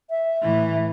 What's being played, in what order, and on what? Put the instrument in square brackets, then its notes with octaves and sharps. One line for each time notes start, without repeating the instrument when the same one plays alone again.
[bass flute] E5
[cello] A2 E3